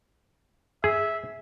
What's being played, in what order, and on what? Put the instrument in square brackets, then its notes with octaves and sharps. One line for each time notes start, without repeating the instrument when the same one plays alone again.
[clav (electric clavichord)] G#4 [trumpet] E5